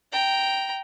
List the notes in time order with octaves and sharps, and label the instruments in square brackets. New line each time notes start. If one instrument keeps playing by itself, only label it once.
[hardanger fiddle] G5 A#5